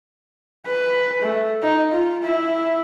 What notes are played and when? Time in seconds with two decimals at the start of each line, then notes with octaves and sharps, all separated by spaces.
0.66 B4
1.22 A3
1.62 D#4
1.92 F4
2.23 E4